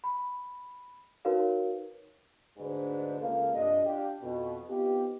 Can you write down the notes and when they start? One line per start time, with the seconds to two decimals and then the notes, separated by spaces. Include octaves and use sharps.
0.04 B5
1.25 D#4 F#4 A#4 B4 C#5 F5
2.58 D2 G#2 G#3 D4 B4 C5
3.21 C#2 A#3 A4 F5
3.53 G2 C3 F3 D4 D#5
3.84 D4 F4 G4
4.22 F2 B2
4.69 B3 C4 D#4 F4 G4